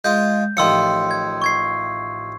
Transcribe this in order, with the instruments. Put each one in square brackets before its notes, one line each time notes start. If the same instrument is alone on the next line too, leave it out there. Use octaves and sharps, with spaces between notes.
[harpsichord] G#3 F4 [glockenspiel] G6
[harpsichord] A1 D#3 F3 [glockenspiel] C6 E6 C#7
[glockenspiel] G#6
C#6 G#6 C7